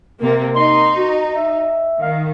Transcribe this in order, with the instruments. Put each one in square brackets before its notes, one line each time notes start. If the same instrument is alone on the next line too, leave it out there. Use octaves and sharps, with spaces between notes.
[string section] C3 A#3
[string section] D#4 [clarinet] C6
[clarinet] F#4
E5
[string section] D#3 [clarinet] F5